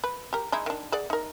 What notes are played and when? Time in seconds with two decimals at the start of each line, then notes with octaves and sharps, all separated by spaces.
0.04 B4
0.33 G4 A#4
0.52 G#3 D#4 E4
0.66 D#3 D4
0.92 G#4 D5 F#5
1.10 D#4 A#4